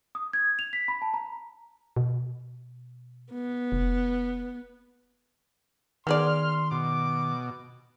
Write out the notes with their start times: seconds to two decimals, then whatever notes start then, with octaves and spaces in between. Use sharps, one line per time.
0.15 D#6
0.33 G#6
0.59 F7
0.73 B6
0.88 B5
1.02 A5
1.14 A#5
1.96 B2
3.32 B3
3.72 F1
6.07 D#3 B3 G#4 D5 C6 F6
6.71 B2 D6